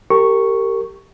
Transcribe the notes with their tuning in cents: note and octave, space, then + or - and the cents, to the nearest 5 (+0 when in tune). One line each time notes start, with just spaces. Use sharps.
G4 +0 A#4 -30 C#6 +0